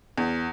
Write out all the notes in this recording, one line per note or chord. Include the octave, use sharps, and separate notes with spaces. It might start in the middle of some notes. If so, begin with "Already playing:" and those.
E2